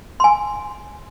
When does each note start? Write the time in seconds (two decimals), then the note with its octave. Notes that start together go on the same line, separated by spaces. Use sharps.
0.20 G#5 C6